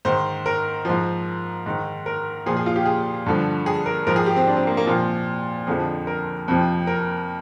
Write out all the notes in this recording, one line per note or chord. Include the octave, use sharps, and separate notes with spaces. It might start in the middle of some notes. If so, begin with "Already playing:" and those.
G#2 D#3 C5
A#4
G#2 F3
G#2 D#3
A#4
A#2 F3 G#4
G#4
F4
G4
G#4
G2 D3 F3
G#4
A#4
G#2 F3 A#4
G#4
G4
C4
D4
C4
A#3
A#3
A#2 F3 C4
F2 D3 F3 G#4
A#4
F2 C3 F3
A#4